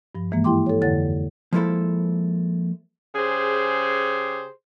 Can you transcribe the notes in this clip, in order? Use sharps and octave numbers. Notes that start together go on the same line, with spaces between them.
G2 F3
G#2 E3 G#3 A#3
E4 G4 G5 C6 D6
A4 C#5
F2 D3 E4 C#5 F#5 A6
F3 G#3 A#3 E4 A4 C5
C#3 G4 G#4 C5